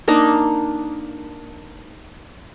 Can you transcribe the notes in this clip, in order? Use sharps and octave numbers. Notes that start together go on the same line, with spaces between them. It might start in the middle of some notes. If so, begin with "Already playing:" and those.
A#3 D4 D#4 A#5